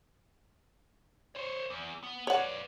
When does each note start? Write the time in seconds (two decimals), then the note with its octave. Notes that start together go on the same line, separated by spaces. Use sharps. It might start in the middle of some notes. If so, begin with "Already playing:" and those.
1.35 C5 C#5
1.70 E2
2.03 B3
2.27 B4 C#5 D5 F#5